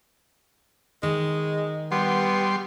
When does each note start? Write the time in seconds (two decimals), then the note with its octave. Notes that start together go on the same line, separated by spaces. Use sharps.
1.03 D#3 G#3
1.92 G3 B3 C6